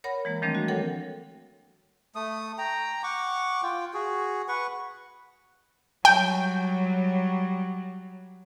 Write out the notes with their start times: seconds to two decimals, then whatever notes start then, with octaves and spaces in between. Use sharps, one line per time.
0.04 A#4 C#5 F#5 B5 A#6
0.25 E3 G#3 A#3
0.42 D#3 F3 G3 A3 C4 D4
0.55 F#4
0.68 A4 A#4 C#5 F#5 G5
2.15 A3 D#6
2.58 G5 A#5
3.03 F#5 C#6 D6
3.63 F4 G5
3.94 F#4 G#4
4.48 B4 F#5 C#6
6.05 F#3 G3 G5